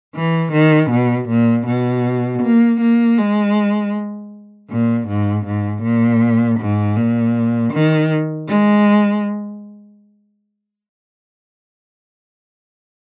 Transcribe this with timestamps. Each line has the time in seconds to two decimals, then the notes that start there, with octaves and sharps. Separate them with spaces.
0.15 E3
0.53 D#3
0.91 B2
1.29 A#2
1.66 B2
2.42 A#3
2.81 A#3
3.18 G#3
4.70 A#2
5.08 G#2
5.46 G#2
5.83 A#2
6.60 G#2
6.97 A#2
7.73 D#3
8.48 G#3